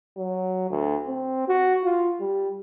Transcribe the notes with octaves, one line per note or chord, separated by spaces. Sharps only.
F#3
D2
C4
F#4
F4
G3